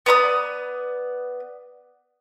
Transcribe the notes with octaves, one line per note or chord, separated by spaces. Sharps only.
B3 D5 A#5 D#6